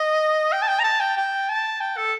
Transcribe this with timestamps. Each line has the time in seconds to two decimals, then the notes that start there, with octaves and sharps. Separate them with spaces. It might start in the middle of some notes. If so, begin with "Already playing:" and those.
Already playing: D#5
0.52 G5
0.62 A5
0.68 G5
0.79 A#5
0.83 A5
1.00 G5
1.16 G5
1.49 A5
1.81 G5
1.97 A4